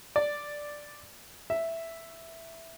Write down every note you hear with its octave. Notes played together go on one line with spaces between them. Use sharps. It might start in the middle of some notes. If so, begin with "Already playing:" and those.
D5
E5